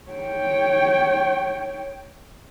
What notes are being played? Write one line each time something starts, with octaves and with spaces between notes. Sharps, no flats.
C#5 G5